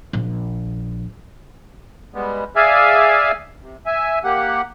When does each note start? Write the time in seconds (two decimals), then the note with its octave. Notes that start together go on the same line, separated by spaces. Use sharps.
0.13 A#1
2.14 G3 G#3 B3
2.56 G#4 D5 E5 F5 G#5
3.63 C3
3.86 E5 G#5
4.24 A#3 G4 F#5